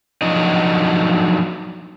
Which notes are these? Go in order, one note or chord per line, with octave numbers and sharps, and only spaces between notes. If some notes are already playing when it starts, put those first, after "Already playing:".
F3 F#3 D4 D#4 D#5